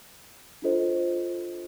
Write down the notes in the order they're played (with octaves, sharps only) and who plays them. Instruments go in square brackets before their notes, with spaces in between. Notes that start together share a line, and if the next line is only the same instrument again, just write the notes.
[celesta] D4 F4 A4 C5 D#5